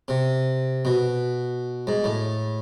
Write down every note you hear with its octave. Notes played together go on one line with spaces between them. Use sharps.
C3
B2
G#2
A2